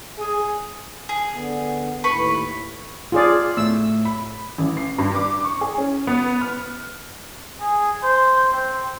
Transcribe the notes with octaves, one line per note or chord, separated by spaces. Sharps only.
G#4
G#4
D3 B3
D#2 A2 B4 B5 C#6
F4 G#4 D5
A2 E6
B5
A1
C7
G2
D6
C#6
G#4
C#4
B3
F6
G#4
C5
C4